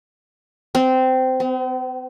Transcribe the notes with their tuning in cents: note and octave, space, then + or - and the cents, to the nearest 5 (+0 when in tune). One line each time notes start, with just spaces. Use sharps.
C4 -15
C4 -45